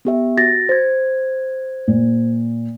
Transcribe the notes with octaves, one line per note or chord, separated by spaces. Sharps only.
B3 G4 E5
F#4 A6 A#6
C5 G#6
A#2